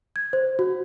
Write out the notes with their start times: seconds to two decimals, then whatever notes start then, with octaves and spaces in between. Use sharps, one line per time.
0.16 G#6
0.33 C5
0.59 F#4